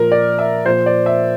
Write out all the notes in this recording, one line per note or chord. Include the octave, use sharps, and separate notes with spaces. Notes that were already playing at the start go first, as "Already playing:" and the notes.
Already playing: A#2 F3 A#4
D5
E5
A#2 F3 C5
D5
E5